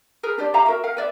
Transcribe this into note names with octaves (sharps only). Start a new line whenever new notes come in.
G#4 A#4 B4
D4 G4 C5 D5
G4 E5 F5 A#5
F#4 A#4 E5
A#4 F5 F#5
B4 D5 E5